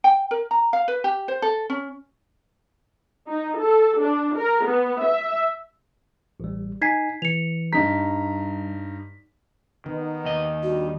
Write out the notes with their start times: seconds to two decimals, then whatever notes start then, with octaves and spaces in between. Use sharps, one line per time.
0.04 G5
0.31 A#4
0.51 A#5
0.73 F5
0.88 B4
1.04 G4
1.28 C5
1.42 A4
1.70 C#4
3.28 D#4
3.59 A4
4.00 D4
4.36 A#4
4.65 B3
5.03 E5
6.40 A1 G3
6.82 D#4 G#5 G#6 B6 C7
7.22 E3 C#7 F7
7.73 G2 G3 D#4 A#5 B6
9.86 D#3 B3 D#4
10.24 D#2 D#5
10.63 G3 D4 F#4